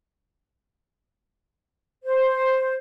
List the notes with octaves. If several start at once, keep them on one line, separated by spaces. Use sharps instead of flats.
C5